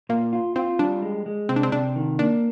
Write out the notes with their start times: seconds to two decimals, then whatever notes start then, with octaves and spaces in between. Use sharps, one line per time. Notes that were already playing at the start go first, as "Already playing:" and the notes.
0.09 A#2 A#3
0.33 F4
0.56 C4 F4
0.79 G3 D4
1.02 G#3
1.26 G#3
1.49 C3 C4
1.56 D4
1.63 C4
1.72 C3 D4
1.96 D#3
2.19 A#3 D4